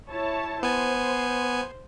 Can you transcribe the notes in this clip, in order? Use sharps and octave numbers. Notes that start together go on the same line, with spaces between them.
E4 C#5 A5
B3 C5 G#5